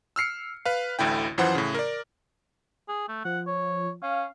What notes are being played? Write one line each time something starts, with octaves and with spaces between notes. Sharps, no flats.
E6 F6 C7 C#7
B4 F5
A1 D2 D3 E4 G5
F#2 E3 F3 C5 F#5 C6
A2 C#3
A#4 D5
G#4
A3
F3 F#5
C#5
C#4 F5